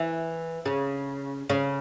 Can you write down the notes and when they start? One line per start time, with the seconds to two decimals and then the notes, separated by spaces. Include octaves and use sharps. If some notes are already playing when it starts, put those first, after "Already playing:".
Already playing: E3
0.66 C#3
1.50 C#3